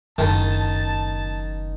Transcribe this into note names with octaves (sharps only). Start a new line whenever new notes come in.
F#1 D#3 A5